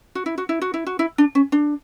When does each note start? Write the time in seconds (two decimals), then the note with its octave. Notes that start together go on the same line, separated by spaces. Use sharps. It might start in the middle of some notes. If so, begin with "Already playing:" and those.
0.15 F#4
0.26 E4
0.38 F#4
0.49 E4
0.62 F#4
0.74 E4
0.87 F#4
0.99 E4
1.18 D4
1.35 C#4
1.52 D4